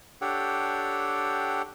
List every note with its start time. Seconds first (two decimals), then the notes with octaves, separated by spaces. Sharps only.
0.21 D4 G4 A4 C#5 F#5 G5